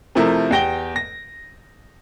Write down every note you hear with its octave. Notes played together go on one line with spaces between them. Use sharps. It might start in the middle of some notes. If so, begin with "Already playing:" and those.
C3 F3 A3 E4 A#4
E2 G4 G5 A#6 D7 G7
A#6